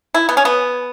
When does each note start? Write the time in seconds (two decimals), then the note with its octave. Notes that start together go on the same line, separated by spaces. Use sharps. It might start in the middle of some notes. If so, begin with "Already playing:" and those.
0.14 E4
0.29 B3
0.37 C#4
0.45 B3